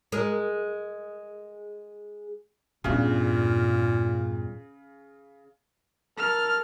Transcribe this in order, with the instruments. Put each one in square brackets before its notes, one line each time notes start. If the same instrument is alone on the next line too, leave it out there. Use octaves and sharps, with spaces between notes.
[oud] G#3 A#4
[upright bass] E2 G2 [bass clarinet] A#2 [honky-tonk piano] C#3
[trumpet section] A4 A#4 [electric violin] F6